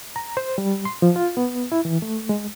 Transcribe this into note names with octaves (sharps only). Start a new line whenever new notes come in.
A#5
C5
G3
C6
F3
F4
B3
E4
E3
A3
G#3